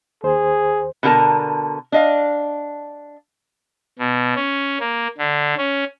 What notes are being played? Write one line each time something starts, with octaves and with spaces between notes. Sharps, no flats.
D#2 G#4 C5
B2 D3 D4 A#4 A5 A#5
D4 D#5 F5
B2
C#4
A#3
D3
C#4